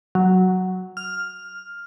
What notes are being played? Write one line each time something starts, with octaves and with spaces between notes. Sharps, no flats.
F#3
F6